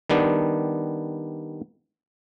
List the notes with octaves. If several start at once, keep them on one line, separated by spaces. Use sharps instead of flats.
D#3 G3 B3 D4